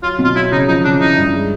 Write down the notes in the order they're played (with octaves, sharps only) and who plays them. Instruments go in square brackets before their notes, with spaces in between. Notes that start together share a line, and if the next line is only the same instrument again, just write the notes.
[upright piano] F#3 [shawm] F4
[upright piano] B2
[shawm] F4
[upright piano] F#3 [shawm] E4
[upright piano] C#3 [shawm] D#4
[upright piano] F3 [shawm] D#4
[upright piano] C#3 [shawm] D4
[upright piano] E3 [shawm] D#4
[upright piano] G2
G#3